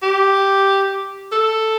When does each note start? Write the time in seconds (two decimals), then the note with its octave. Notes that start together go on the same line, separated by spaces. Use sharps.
0.02 G4
1.32 A4